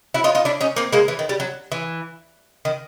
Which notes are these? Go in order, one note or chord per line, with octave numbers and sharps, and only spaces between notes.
E4 F#4
D#4 F4
D#4 F4
D4 E4
C#4 D#4
A#3 C4
G#3 A#3
E3
D#3
G3
F#3
E3
D#3